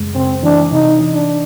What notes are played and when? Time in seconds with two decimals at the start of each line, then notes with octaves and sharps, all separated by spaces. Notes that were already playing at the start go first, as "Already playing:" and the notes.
Already playing: F#2 C#3 G#3
0.15 C#3 C4
0.43 E3 D4
0.72 C3 D#4
1.01 E3
1.15 D4